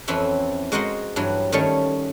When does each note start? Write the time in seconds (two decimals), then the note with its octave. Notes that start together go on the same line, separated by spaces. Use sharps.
0.08 F2 E3 C4 C#4 E4 B5
0.72 G#3 F#4 A#4 C5 D#5 F#5
1.16 G2 E3 F#3
1.52 D#3 G3 A3 C#4 C#5